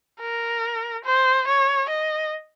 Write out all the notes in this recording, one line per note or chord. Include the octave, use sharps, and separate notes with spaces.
A#4
C5
C#5
D#5